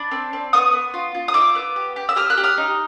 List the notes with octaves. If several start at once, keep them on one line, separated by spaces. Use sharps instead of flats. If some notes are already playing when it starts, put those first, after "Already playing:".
Already playing: D4 B5
C4
C4
B3 C#6 D#6
B3
F4
F4
D#6
D#4 D6 E6
B3
G4
G4
E6
G4 D#6 F6
E6 F#6
G4
D#6 F6
D#4